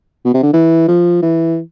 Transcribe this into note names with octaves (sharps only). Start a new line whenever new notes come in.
B2
C3
D3
E3
F3
E3